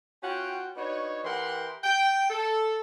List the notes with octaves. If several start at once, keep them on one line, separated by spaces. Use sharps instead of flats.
C#4 F4 F#4 F#5 G5
B3 D4 D#4 F#4 C#5
E3 G4 A#4 F#5 G5 C6
G5
A4